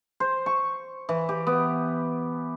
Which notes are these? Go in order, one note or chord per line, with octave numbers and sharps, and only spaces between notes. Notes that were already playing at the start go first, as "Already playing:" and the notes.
C5
C#6
E3
G4
B3